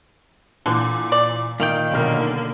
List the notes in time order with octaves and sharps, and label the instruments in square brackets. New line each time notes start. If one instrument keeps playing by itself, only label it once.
[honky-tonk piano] A#2 E3 [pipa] D3
[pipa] D5
[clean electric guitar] A#2 D#3 G5 [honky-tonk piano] F5
[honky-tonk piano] B1 F6 [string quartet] B2 D3 A#3